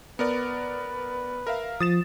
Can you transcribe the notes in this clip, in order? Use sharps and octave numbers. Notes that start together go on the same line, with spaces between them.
B3 A#4 B4 D5
A#4 E5 F5
F3 D#6 A6 E7